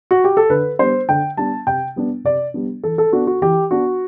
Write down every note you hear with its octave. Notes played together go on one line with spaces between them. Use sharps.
F#4
G4
A4
D3 B4
G3 B3 D4 C5
D3 G5
G3 B3 D4 A5
C3 G5
G3 B3 D4
C3 D5
G3 B3 D4
E3 A4
A4
B3 D4 F#4
F#4
E3 G4
B3 D4 F#4